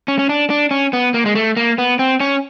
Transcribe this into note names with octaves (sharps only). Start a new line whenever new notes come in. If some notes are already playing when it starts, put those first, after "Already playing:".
C#4
C#4
D4
D4
C#4
B3
A#3
G#3
A3
A#3
B3
C4
C#4